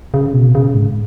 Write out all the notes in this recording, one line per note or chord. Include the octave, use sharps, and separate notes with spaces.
C#3
B2
C#3
G#2